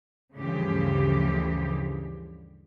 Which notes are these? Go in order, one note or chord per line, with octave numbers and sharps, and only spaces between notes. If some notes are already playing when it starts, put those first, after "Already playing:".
D2 G2 C#3 E3 F3 G4